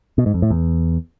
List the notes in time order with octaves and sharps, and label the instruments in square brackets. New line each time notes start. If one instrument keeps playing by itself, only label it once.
[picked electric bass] B2
G#2
F2
A2
E2